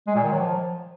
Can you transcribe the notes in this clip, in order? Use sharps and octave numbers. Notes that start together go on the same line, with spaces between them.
G#3
A#2
D#3
F#3
F3